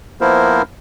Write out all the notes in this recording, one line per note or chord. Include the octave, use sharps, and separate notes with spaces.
F3 A#3 B3 E4 A#4 C5